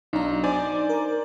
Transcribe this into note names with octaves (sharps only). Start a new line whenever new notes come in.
B1 D4 D#4 A#5
C5 D5 G#5
A#4 A#5